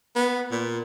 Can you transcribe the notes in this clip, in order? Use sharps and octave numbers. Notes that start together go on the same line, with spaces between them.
B3
A#2